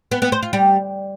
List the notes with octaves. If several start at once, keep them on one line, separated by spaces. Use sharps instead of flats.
B3
B3
C5
F4
G3